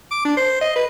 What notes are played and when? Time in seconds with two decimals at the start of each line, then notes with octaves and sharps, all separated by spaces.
0.11 D6
0.25 D4
0.37 C5
0.61 D#5
0.76 B4